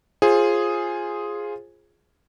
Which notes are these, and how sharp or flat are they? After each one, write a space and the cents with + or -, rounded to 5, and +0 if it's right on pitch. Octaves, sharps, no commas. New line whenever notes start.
F4 +0 G#4 +0 C5 +25